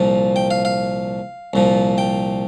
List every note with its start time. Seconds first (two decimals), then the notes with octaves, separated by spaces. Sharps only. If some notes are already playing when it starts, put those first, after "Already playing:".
Already playing: C2 A#2 F3
0.36 G5
0.51 F5
0.65 F5
1.53 C2 A#2 F3
1.98 G5